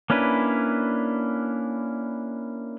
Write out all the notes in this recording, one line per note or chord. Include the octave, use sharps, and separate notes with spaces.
A#3 C#4 D4 E4 B4